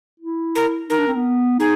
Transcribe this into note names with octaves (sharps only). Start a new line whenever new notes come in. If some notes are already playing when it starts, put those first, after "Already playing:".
E4
A#4
D#4 A#4
D4
C4
B3
D#4 G#4